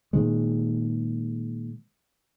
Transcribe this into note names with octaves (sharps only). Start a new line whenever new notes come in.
A#2 D#3 G#3